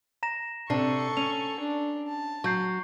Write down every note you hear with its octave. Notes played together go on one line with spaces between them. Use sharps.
A#5 A#6 E7
C3 D4 A4 C#6 C7
C#4 F7
D4
A5
F#3 C#6 G6 C7